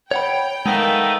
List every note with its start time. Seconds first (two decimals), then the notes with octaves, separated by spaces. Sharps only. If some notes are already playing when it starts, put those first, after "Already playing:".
0.11 C#5 F#5 G5 B5
0.66 G#3 A3 B3 D#4 A#4 F5 E6